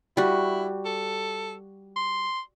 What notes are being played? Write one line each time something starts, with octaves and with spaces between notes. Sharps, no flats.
G3 E4 F#4
A4
C6